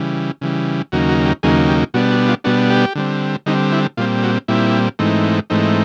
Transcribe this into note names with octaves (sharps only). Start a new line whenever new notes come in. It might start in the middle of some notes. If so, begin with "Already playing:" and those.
Already playing: C#3 E3 G3
C#3 E3 G3
D#2 C#3 F#3 A#3 D#4 F#4
F#4
G4
D#2 C#3 F#3 A#3 D#4 G#4
G4
B2 G3 B3 D4 F#4
F#4
F4
B2 G3 B3 D4 F#4
G4
D3 G3 C4
D3 G3 C4 D#4
E4
A#2 G3 C4 F4
F#4
A#2 G3 C4 E4
G#2 E3 A3 C4 D#4
G#2 E3 A3 C4 D#4